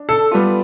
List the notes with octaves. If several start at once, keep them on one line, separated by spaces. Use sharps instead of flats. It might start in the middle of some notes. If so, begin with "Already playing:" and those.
Already playing: D4
A4
G3 B3 F4 A4